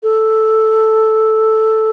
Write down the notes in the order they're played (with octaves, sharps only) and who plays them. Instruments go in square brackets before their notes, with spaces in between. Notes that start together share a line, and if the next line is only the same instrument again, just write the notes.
[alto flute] A4